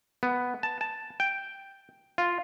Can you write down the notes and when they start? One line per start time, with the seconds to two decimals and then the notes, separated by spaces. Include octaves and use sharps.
0.23 B3
0.63 A5
0.81 A5
1.20 G5
2.18 F4